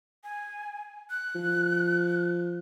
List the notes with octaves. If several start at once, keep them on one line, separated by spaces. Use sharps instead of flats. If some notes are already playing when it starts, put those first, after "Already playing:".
G#5
F#6
F3